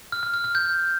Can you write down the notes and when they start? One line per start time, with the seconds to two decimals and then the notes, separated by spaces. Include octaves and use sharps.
0.12 F6
0.23 F6
0.34 F6
0.44 F6
0.55 G6